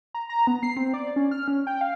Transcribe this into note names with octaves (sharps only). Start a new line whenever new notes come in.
A#5
A#5
B3
C7
C4
D5
C#4
F6
C#4
G5
F5